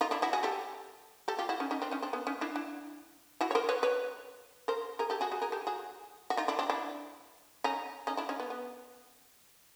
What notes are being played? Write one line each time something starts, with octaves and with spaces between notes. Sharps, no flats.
D#4 F4
D4 E4
E4 F#4
F#4 G#4
G4 A4
G4 A4
F4 G4
E4 F#4
C#4 D#4
C#4 D#4
C4 D4
C#4 D#4
C4 D4
B3 C#4
C#4 D#4
D4 E4
D4 E4
E4 F#4
C#5
A#4 C5
B4 C#5
B4 C#5
A#4 C5
G#4 A#4
G4 A4
F#4 G#4
F#4 G#4
G#4 A#4
G4 A4
F#4 G#4
F#4
D#4 F4
D4 E4
C4 D4
D4 E4
C#4 D#4
C#4 D#4
D4 E4
C#4 D#4
B3
B3